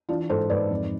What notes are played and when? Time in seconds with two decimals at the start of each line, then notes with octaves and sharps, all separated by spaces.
0.09 E3 D4 F4
0.30 G#2 A4 C5
0.50 G#2 B4 D5
0.70 F2